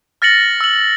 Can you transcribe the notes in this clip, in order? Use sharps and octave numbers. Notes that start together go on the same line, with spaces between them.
F6 A6 A#6 C#7 F#7
E6 F#7